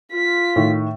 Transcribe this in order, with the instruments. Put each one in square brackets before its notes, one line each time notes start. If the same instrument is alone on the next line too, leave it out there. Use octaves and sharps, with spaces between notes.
[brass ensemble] F4 [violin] B6
[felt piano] A2 D#3